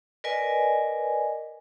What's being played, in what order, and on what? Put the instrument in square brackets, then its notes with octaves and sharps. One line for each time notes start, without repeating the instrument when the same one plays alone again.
[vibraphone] A#4 B4 D5 D#5 G#5